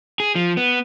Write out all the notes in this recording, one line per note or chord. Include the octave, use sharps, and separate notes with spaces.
G#4
F3
B3